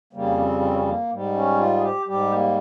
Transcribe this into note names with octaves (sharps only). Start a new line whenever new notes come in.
F2 C#3 G3 A#3
C4
C4
C#4
C4
A#3
G#2 G3
C#4
F4
G#4
G4
G#2 G3 G4
A#3